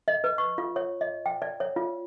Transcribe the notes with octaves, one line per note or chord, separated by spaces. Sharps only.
D#5
B4
C#6
F4
C#5
D#5
G5
D5
C#5
F4